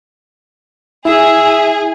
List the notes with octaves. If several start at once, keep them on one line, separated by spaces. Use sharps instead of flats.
E4 G#4 E5